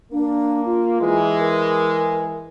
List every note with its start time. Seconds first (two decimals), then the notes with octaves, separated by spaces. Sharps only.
0.12 A#3 D4
0.66 F4
1.00 E3 G#3
1.39 A#4